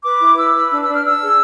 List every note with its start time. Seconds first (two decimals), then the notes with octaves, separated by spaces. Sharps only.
0.04 B4 D6
0.20 E4
0.37 B4 E6
0.54 B4
0.71 D4 E6
0.82 E6
0.88 D4
0.93 F6
1.04 D4 E6
1.22 G#4